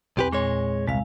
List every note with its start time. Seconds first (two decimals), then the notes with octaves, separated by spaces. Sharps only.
0.17 B1 E2 C4 G4 B4
0.32 A#2 G#3 C#5 C6 A#6
0.88 C2 G#3 E4 F5